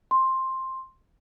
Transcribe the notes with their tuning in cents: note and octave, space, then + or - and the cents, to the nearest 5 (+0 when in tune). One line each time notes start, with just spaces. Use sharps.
C6 +10